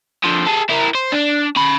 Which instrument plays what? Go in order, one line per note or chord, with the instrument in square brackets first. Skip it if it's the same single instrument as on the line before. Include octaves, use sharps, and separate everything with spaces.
[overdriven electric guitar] D3 F3
G#4 A4
E4 A#4
C5
D4
C#4 B5